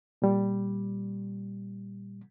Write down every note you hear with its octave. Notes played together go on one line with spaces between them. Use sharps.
A#2 G3